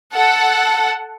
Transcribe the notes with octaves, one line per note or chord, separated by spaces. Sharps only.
A4 F#5